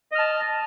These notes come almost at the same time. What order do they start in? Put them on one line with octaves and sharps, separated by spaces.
D#5 F6 A5